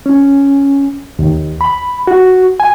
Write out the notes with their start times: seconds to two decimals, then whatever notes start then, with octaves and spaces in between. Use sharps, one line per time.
0.06 C#4
1.19 D#2
1.61 B5
2.07 F#4
2.60 G#5